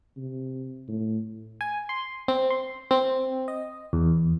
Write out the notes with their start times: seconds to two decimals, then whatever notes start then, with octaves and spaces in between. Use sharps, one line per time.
0.17 C3
0.88 A2
1.61 G#5
1.89 C6
2.28 C4
2.50 C6
2.91 C4
3.48 D#5
3.93 E2